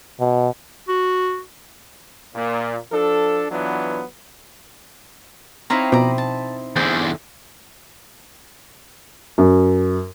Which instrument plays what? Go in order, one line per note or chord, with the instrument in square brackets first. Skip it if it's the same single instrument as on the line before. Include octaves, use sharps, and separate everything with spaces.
[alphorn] B2
[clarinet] F#4
[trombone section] A#2
F3 D4 A4
E3 F#3 B3 D4 F4
[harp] C4 D#4 E4 [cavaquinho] C#5 F5 A#5
[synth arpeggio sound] B2 F3 [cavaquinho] D5 A#5
[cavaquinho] A5
[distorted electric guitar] E2 D3 [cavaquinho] G#4 C5 D5
[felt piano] F#2